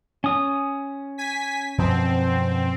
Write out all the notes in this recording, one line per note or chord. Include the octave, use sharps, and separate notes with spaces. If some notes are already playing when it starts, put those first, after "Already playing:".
C#4 D#6
G#5 B6
F#2 B2 F3 C4